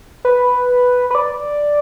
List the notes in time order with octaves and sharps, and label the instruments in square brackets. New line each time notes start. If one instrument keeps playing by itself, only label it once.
[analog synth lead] B4
B4
D5